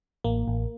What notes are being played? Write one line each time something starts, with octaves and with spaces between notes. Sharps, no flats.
A1 A#3
A1